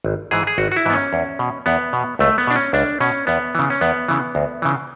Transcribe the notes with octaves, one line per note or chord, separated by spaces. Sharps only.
G#1
G#2 E3 G#4
G#4
G#1 F#4
F#4
E4
G#2 E3 B3
C#4
E2
B2
E2 B3
B2
C#2 A3
B3
B2 D4
C#4
C#2 D4
B2 C#4
E2 B3
C#3 E3
C#4
E2 B3
C#3 E3
D2
C#3 E3